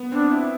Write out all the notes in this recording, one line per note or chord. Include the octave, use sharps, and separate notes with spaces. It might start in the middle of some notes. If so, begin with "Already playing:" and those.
Already playing: B3
C4 D4
E4